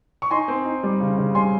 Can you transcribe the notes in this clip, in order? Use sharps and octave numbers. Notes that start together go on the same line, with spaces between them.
C#6
D#4 G#5 C6
C4
D#4
G3
C#3
C#3
G3 G#5 C6